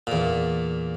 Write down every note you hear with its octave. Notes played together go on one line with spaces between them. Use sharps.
E2 A#2